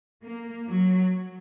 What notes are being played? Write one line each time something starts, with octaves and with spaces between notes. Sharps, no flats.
A#3
F#3